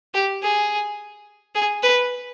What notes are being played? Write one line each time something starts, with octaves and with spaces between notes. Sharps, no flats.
G4
G#4
G#4
B4